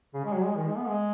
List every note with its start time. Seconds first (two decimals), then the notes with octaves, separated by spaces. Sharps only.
0.14 C#3
0.25 G#3
0.35 F#3
0.46 G#3
0.56 D#3
0.67 G#3
0.78 B3
0.88 G#3